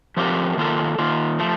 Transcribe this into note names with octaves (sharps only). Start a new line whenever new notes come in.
F3 A3 C4 G4 A#4
D#3 A#3 F4 A4
D#3 A#3 F4
F3 A3